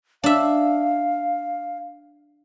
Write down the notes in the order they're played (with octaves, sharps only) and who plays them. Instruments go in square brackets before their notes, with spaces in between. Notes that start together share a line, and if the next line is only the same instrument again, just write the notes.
[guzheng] D4 E5 [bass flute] F5